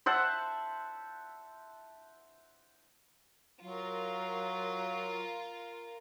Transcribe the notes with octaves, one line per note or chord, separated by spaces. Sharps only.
C5 E5 F#5 A5
F#3 F4 A#4